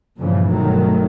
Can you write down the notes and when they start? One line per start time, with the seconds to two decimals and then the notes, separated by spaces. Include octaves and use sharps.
0.18 G2 A#2 C#3 E3 F3
0.49 G1 B2 D#3 F#3 A3